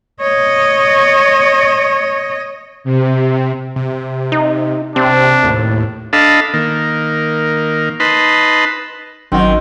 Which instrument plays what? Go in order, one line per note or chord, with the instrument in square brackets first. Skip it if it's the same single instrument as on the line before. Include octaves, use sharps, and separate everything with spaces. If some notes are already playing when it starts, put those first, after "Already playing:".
[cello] C#5 D#5
[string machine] C3
[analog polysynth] C3
[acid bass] D#4
[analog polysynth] C3 [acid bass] C4 [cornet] D4
[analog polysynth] D#2 A2
[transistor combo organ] D4 A4 D#5 F5 A5 B5
D#3 A#3
D#4 B4 A5 B5 C6
[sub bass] G#1 [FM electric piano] F#2 F#4 [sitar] D#3 [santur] C4